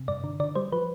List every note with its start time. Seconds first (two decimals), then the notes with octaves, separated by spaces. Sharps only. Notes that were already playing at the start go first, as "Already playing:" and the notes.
Already playing: C3
0.08 G2 D5
0.24 D3
0.40 D3 D5
0.55 G3 C5
0.72 F3 B4